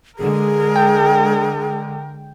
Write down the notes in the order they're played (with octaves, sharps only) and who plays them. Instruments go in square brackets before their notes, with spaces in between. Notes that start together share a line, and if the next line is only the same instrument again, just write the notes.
[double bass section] D3 G#3 [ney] G#4 [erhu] A#4
[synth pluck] G5